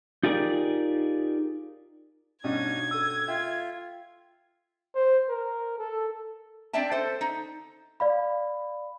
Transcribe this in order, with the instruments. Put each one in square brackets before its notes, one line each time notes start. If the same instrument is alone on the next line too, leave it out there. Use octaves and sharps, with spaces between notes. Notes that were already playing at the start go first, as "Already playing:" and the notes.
[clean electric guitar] D#4 F4 G4 G#4 A#4 D5
[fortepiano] G2 B2 C#4 [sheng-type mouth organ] D#4 D#6 [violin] G#6
[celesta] A4 E6 [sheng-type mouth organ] D#6
[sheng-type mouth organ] F4 [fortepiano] E5 G5
[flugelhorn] C5
A#4
A4
[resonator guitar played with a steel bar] C4 D4 D5 E5 G5 A5
A4 C5
D#4
[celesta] D5 F5 B5